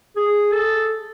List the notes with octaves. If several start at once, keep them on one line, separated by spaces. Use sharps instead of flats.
G#4
A4